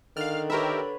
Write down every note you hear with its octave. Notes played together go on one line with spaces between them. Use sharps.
D3 D#3 F5 F6
G4 A#4 B4 C#5 E5